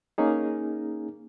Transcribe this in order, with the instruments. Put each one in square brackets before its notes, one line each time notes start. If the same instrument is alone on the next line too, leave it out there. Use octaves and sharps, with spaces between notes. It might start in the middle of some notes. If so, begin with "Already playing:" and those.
[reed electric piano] A#3 C#4 D#4 G#4